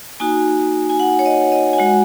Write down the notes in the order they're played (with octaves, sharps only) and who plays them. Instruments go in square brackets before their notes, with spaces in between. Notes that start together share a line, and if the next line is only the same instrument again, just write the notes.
[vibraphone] A#3 D#4 F#4 G#5
G#5
F#5
C#5
D#5
D#5
G#5
G#3 F#4 F#5